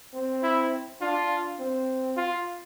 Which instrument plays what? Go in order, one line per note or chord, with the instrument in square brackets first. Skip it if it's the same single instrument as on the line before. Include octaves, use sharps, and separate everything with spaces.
[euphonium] C4
[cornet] E4
[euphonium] D4 [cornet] F4
[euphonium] C4
[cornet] F4